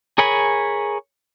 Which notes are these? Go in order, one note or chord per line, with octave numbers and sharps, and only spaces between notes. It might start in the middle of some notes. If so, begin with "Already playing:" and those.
G#4 A#4 C#5 G#5 B5